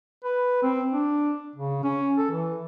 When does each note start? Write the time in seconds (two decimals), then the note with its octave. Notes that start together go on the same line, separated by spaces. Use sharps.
0.24 B4
0.63 C4
0.92 D4
1.56 C#3
1.84 C#4
2.18 A4
2.31 E3